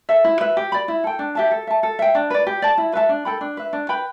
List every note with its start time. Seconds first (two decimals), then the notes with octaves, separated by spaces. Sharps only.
0.09 A4 E5
0.24 E4
0.41 B4 E5
0.57 G4
0.72 D5 B5
0.88 E4
1.04 A4 G5
1.19 D4
1.35 G4 E5 A5
1.51 A4
1.67 E5 A5
1.83 A4
1.99 E5 G5
2.15 D4
2.30 B4 D5
2.47 G4
2.62 D5 A5
2.78 E4
2.93 B4 E5 A5
3.09 D4
3.25 A4 G5 B5
3.41 D4
3.57 B4 E5
3.73 D4
3.89 B4 G5 B5